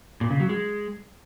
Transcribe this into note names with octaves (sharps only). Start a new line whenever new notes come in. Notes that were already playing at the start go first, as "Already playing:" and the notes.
A#2
C#3
F#3
G#3